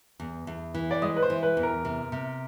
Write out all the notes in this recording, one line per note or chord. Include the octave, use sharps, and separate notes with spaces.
E2
E2
E3
D5
G#3 D#5
B4
C5
E3
B4
E2
A#4
C3
C3